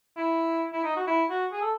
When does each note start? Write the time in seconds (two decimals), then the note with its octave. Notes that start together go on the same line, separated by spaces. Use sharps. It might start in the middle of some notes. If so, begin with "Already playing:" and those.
0.17 E4
0.73 E4
0.84 D#4
0.96 F#4
1.07 E4
1.30 F#4
1.52 G#4
1.61 A4